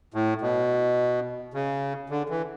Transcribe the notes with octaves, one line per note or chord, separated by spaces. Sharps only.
A2
B2
C#3
D3
E3